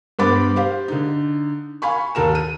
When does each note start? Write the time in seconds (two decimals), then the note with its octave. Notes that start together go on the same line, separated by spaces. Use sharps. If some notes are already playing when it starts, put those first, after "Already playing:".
0.19 G2 B3 C5 B5 D6 A6
0.56 G4 C5 F5
0.88 D3 D#4
1.82 F5 G#5 B5 C#6
2.15 D#2 A4 A#4 E7
2.35 D#7